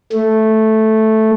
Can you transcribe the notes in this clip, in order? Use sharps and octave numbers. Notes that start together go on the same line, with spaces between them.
A3